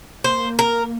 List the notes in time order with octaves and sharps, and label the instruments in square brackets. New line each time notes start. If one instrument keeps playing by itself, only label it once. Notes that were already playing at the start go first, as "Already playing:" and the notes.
[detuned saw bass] A#3 [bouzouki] C5
[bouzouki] A#4